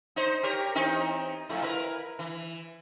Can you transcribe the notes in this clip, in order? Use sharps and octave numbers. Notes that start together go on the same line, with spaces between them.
D#4 C5
G4 A#4 C#5
E3 C4 D#4
F2 A3 E4
E4 A#4 B4
E3